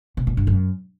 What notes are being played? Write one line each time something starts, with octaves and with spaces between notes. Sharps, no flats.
B2
A#2
G2
F#2